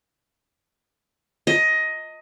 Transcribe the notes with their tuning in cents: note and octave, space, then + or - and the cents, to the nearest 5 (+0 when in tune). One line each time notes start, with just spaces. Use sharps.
D#5 +15 A#5 -45